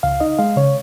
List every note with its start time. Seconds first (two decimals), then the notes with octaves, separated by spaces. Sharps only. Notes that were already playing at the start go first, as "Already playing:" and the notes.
0.03 C#2 F5
0.20 D#4 D#5
0.39 G#3 F5
0.56 C#3 C#5